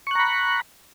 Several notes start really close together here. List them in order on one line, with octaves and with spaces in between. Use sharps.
C#6 F#6 A#5 B5